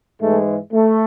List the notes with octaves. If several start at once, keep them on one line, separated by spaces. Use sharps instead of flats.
G#2 E3 G#3 A3
A3